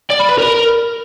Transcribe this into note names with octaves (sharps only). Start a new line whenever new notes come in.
D5
B5
B4
A#4